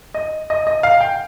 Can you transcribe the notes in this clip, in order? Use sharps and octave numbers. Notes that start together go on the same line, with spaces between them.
D#5
D#5
D#5
F5
G5